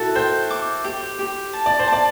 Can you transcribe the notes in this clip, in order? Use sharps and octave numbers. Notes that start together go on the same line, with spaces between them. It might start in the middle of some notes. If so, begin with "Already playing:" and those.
Already playing: E4 F#4 A4
C5 G5
D6
G4
G4
A5
D5
C5
D5 A5